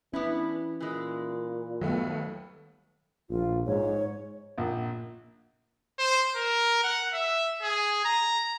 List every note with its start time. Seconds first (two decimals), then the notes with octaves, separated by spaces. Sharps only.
0.13 E3 B3 C#4 D4 E4
0.81 A#2 E3 G#3
1.82 D#2 F#3 G3 A3 B3
3.29 A#1 F4
3.67 G#2 C#5
4.58 A#1
5.99 C5
6.36 A#4
6.84 F#5
7.13 E5
7.62 G#4
8.05 A#5